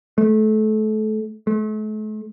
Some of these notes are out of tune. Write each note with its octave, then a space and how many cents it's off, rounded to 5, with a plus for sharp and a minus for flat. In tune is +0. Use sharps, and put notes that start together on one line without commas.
A3 -30
A3 -40